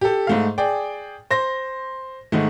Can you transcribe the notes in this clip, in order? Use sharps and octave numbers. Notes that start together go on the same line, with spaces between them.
G4 A4
G#2 A3 F5
G#4 D5 G5
C5 A#6
G#2 D#3 A3